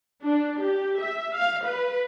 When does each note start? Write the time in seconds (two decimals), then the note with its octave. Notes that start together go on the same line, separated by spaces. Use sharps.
0.24 D4
0.63 G4
1.00 E5
1.36 F5
1.65 B4